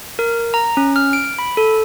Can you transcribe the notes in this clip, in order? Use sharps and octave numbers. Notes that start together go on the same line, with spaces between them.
A#4
A#5
C#4
F6
D7
B5
A4